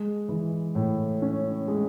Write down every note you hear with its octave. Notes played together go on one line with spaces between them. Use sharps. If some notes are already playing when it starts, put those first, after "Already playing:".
Already playing: G#3
E3
A2
C#4
G#3